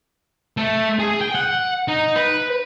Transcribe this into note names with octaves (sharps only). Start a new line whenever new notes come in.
A3
G#4
G5
F#5
D#4
B4